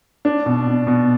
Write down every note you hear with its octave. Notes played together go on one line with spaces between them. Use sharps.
D4
B2
B2
B2